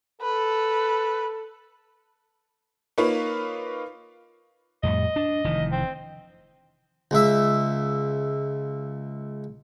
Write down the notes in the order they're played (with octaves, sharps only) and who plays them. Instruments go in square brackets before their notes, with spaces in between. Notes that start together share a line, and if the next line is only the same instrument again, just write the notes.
[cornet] A4 [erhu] B4
[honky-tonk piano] A#3 D#4 F4 B4 C#5
[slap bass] F2 A2 G3 [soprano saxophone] D#5
[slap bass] D4
F1 D#3 E3
[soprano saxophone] C4
[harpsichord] C#2 E5